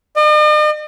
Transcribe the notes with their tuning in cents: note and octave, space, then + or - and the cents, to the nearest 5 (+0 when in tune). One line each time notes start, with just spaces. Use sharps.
D#5 -45